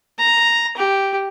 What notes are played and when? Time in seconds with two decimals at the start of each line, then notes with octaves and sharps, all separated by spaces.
0.19 A#5
0.77 G4